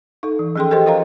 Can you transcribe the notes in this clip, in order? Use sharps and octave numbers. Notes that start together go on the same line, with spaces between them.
D#4 A4
E3
F3 C#4 G#4 A4 G5 C6
G4 A4 A#4 C5 D#5 G5
F4 A#4 C5 D#5 F5 A#5